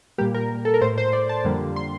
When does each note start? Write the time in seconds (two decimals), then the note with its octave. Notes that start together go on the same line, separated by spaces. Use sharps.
0.18 A#2 G3 A#3 G4
0.34 A#4
0.65 A4
0.74 A#4
0.81 A2 A3 C5
0.98 C5
1.13 D5
1.29 A5
1.44 F2 D3 G3 A#3
1.76 C6